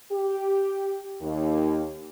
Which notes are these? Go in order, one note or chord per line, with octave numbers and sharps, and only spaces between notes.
G4
D#2